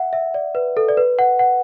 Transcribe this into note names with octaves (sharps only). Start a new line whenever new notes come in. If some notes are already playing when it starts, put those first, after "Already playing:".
Already playing: E5 F#5
E5
D5
B4
A4
D5
B4
F#5
F#5